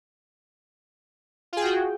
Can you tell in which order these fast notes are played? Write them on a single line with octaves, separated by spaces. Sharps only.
F4 G#4 G5 F#4